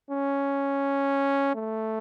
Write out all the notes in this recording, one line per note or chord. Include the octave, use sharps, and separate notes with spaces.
C#4
A3